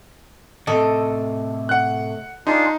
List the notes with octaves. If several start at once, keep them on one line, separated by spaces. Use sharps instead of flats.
A2 C3 A4 D#5
F#5 F#6
D4 D#4 F4 G#4